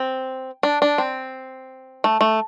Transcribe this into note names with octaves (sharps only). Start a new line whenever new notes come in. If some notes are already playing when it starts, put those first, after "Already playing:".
Already playing: C4
D4
D4
C4
A3
A3